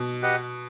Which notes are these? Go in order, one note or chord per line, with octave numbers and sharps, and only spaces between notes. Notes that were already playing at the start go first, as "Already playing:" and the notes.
Already playing: B2
G4 B4 D#5 F#5